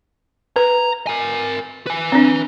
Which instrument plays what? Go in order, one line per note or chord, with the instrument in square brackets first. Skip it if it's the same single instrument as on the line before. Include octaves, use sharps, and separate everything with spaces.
[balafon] B4 [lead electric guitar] A#5
[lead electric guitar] A#4 G#5
B4 G#5
[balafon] C4 D4